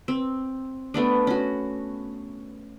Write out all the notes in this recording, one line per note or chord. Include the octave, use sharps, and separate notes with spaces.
C4
A3 B3 D4
C#4 F#4